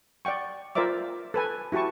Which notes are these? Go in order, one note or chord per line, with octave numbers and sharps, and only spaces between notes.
D5 F#5 G5 C#6
F4 A#4 C5 D5 E5 D6
A4 B4 G#5
E4 F#4 G4 A5 C#6